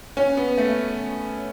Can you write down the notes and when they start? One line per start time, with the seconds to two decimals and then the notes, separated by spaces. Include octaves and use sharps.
0.17 C#4
0.37 B3
0.58 A3